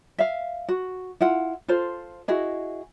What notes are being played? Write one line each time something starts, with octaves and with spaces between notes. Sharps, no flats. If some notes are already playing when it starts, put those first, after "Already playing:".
E5 F5
F#4
E4 F4 F#5
F4 A4 C5
E4 F#4 G#4 D#5